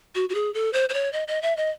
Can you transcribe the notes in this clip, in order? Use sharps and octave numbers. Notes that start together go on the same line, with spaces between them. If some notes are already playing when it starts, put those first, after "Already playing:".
F#4
F#4
G#4
A4
C5
C5
C#5
D#5
D#5
E5
D#5